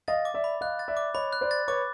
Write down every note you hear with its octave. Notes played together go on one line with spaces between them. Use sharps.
D#5 F5 A6
D6
D5 E5
B5
D#5 F5 F#6
A6
D5 E5
D6
C#5 D#5 B5
F#6
C5 D5
A6
B4 C#5 D6